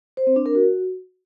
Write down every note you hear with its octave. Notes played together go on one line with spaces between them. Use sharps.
C5
C4
D4
A#4
F#4